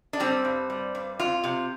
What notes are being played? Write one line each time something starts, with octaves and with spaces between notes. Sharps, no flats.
D4
G3 C4
G2
G3
G2
F2 F4
C3